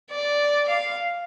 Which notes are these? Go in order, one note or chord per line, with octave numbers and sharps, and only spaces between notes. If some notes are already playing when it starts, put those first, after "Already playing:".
D5
F5